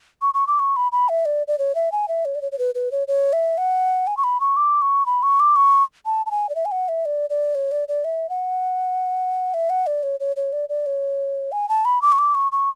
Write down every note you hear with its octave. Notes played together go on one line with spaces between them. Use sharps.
C#6
C#6
D6
C#6
B5
B5
E5
D5
D5
C#5
E5
G#5
E5
C#5
D5
C#5
C#5
B4
B4
C#5
C#5
E5
F#5
G#5
C#6
B5
C#6
D6
C#6
B5
C#6
D6
C#6
A5
A5
G#5
D5
E5
G#5
F#5
E5
D5
D5
C#5
D5
D5
E5
F#5
E5
F#5
D5
C#5
C#5
C#5
D5
D5
C#5
G#5
A5
B5
D6
C#6
D6
C#6
C#6